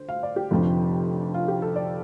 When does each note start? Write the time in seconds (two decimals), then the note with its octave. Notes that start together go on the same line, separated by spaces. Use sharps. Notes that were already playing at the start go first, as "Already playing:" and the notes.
Already playing: D3 C5
0.09 F5
0.23 D5
0.36 G4
0.51 F1 F2 D3 F3
1.34 F4
1.48 G4
1.62 A4
1.76 D5